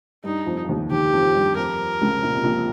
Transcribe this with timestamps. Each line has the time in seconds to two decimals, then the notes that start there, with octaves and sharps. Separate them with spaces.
0.24 G2 G3 D#4
0.46 F2 F3
0.64 F3
0.68 D#2 D#3
0.90 D#2 D#3 G4
1.13 F2 F3
1.35 G2 G3
1.57 F2 F3 A#4
2.01 C#2 C#3
2.23 A#2
2.33 C3
2.44 A#1 A#2